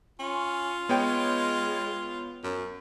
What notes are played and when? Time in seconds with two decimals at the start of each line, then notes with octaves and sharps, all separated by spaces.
0.19 C#4 F4
0.89 G#3 B3 C#5 G5
2.44 F#2